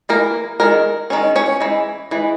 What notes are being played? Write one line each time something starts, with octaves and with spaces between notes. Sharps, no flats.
E3 A#3 A#4
D#3 G#3 A#4
D#3 G#3 C#4
C#4 C#5
E3 G#3
E3 G#3